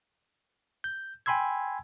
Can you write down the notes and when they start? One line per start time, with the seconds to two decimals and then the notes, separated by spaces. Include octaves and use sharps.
0.84 G6
1.26 G5 G#5 B5 C6 E6 G#6